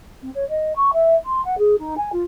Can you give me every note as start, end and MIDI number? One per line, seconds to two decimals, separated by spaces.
0.22 0.29 60
0.34 0.47 73
0.49 0.72 75
0.75 0.90 85
0.93 1.15 76
1.25 1.41 84
1.45 1.58 78
1.58 1.78 68
1.78 1.96 63
1.97 2.10 80
2.12 2.23 65